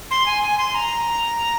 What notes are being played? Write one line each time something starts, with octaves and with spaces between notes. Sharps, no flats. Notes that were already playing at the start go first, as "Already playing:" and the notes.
C6
G#5
G#5
C6
A#5